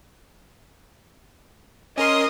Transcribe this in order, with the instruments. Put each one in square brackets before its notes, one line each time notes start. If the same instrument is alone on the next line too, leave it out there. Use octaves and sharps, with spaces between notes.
[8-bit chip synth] C#4 A#4 C6 [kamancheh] D#5 D#6